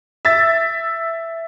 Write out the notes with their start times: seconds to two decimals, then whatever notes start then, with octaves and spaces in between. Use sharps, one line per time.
0.25 E5 A6